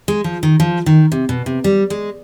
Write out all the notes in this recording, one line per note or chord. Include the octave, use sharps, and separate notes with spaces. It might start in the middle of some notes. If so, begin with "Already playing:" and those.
G#3
F3
D#3
F3
D#3
C3
B2
C3
G3
G#3